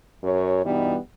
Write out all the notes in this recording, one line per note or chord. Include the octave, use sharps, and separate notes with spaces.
F#2 C#5
G2 B2 E3 G3 B3 D#4